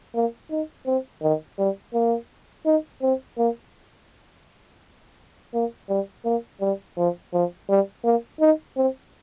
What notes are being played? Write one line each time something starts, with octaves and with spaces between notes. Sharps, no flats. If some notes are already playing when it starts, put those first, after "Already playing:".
A#3
D#4
C4
D#3
G3
A#3
D#4
C4
A#3
A#3
G3
A#3
G3
F3
F3
G3
A#3
D#4
C4